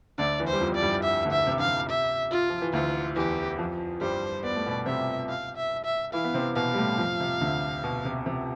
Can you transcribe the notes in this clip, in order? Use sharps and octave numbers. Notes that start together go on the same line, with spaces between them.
D2 D3 D5
E2 E3
C5
G3
F2 F3
D5
G2 G3
E5
D2 D3
E5
C3
D3 F5
C3
E5
F4
F3
E3
D2 D3 F4
E2 E3 G4
F2 F3
G2 G3 C5
B3 D5
A3
B2 B3
C3 C4 E5
F5
E5
E5
E3 E4 F5
B3
C3 C4
B2 B3 F5
G3
A2 A3
F2 F3
C3
D2 D3
B2
C3
C3